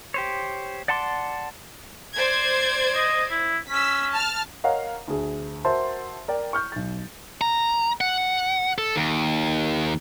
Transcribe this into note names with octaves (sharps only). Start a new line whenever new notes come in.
G4 C5 C#5
D5 F#5 A5 C6 D6
C5 D5 G#6
D#5
E4
C#4 E6 B6
A5 F6
A#4 C#5 D#5 F5 F#5 A#5
D2 G#4
F#4 A#4 C5 E5 A5 C6
A#4 D5 G5
C#6 F6 G6
B1 A6
A#5
F#5
A4
D#2